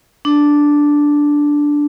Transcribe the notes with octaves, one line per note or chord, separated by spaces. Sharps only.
D4